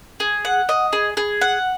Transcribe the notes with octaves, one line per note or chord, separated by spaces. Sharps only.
G#4
F#5
D#5
G#4
G#4
F#5